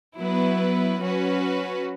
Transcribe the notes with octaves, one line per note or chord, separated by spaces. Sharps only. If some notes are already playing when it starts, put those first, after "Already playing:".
F#3 B3 E4 B4
F#3 C#4 F#4 B4